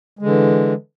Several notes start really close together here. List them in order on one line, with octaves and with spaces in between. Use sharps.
G#3 D3 E3